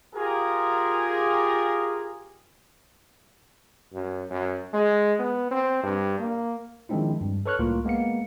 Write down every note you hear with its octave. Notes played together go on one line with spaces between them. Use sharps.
F4 G4 G#4 A#4
F#2
F#2
G#3
B3
C4
G2
A#3
D#3 F3 G#3 C4 D4 E4
G2
A4 B4 C#5 C#6 F6 F#6
C2 A2 A#3 F4 A#4
G#3 A#3 B3 F5 C#7